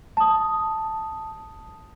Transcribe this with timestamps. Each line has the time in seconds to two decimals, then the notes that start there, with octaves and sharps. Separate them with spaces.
0.17 A5 D#6